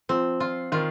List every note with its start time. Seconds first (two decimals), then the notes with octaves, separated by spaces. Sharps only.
0.09 F3 C4
0.40 F4
0.72 D#3 F4